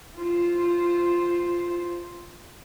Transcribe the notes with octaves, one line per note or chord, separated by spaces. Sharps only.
F4 C5